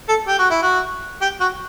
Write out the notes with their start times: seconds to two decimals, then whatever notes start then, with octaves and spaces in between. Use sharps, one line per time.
0.09 A4
0.28 G4
0.39 F#4
0.50 E4
0.62 F#4
1.21 G4
1.41 F#4